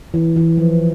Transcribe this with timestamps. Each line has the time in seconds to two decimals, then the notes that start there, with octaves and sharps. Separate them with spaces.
0.14 E3
0.36 E3
0.57 F3